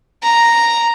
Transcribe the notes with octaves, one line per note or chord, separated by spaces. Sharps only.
A#5